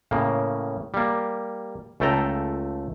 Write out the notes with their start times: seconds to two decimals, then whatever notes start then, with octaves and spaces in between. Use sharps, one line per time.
0.11 A2 C#3 A#3
0.94 G3 A#3
2.00 C#2 A3 A4 G5 A#5